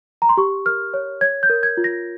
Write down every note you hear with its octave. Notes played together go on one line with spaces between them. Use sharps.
A#5
C6
G4 C#6
A#4 F6
C#5
C#5 G#6
G6
A#4
G#6
F4
A#6